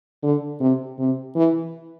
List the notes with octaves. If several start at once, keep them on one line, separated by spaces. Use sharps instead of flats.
D3
C3
C3
E3